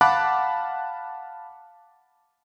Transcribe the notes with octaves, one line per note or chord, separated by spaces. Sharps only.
F5 F#5 A5 B5 D6 F#6